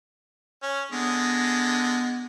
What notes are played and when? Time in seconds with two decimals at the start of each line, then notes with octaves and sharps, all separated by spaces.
0.63 C#4
0.92 D3 G#3 B3